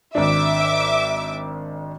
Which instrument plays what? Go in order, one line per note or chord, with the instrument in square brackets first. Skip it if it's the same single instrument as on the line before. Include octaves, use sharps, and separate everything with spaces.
[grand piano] G#1 D4 [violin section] E5 D6